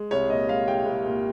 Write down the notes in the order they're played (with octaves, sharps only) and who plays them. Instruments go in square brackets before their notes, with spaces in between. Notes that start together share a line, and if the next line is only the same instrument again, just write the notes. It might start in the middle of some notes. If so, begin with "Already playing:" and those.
Already playing: [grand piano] G#3
C2 C#5
A#2 D#5
G#3 F5
C2 G5
C2
A#2